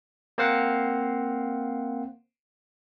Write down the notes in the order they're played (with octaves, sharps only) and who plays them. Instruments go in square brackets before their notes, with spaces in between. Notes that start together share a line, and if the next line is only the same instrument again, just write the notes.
[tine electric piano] A#3 C4 C5 F5 F#5